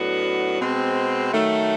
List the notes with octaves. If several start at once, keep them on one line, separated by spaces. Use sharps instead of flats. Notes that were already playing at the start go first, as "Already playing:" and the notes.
Already playing: A2 F#3 B3 D4 F#4
B2 G#3 C4
D#3 F#3 A3